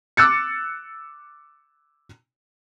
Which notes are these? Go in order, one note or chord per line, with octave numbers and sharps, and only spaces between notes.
D6 E6 F#6 A6 C#7